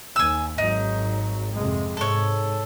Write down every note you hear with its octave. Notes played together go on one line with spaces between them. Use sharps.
D#2 G#5 E6
G#1 F#3 D#4
F2 C3 G#3
G#2 A4 C#5